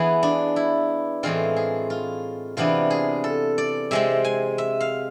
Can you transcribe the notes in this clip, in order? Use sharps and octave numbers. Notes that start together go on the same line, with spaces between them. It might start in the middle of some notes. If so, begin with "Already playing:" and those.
Already playing: E3 B3 G#4
D4
E4
A2 E3 G#3 C4 F4
G#4
F4
C3 E3 B3 D4 F4
G#4
A4
D5
C3 G#3 C4 E5
G#5
E5
F5